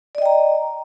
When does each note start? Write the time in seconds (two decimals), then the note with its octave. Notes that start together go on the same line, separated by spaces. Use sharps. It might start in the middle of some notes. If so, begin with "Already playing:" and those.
0.15 D5
0.18 D#5
0.22 G5
0.26 A#5